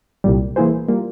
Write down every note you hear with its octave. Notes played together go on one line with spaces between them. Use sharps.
C2 A#2 G3
E3 A#3 E4 G#4 C5
G3 A#3 F4